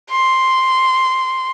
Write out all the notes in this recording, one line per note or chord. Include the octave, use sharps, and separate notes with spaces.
C6